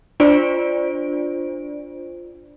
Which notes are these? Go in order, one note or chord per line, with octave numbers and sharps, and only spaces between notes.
D4 F4 C5 D5 D7